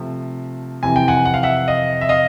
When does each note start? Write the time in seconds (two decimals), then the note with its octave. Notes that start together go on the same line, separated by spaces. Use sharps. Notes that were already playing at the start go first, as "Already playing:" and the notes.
Already playing: C3 F3 A3
0.83 F2 C3 E3 G#5
0.96 G5
1.08 F#5 G#5
1.25 F#5
1.34 F5
1.43 E5 F#5
1.68 D#5 F5
2.01 E5
2.09 D#5 F5